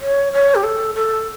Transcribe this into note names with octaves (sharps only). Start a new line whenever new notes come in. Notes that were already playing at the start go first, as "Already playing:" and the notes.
C#5
C#5
G4
A4
A4